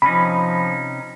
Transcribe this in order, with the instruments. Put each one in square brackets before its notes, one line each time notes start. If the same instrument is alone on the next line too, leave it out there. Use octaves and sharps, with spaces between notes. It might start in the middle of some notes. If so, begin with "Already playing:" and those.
[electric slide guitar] C3 C#4 D#4 [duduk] F3 [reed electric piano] B5